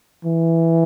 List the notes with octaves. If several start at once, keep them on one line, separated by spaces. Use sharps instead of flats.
E3